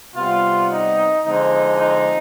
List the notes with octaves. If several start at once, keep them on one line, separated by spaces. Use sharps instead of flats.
C3 G3 B3 F4
D#4
D3 F3 G#3 C4 D#4
D#4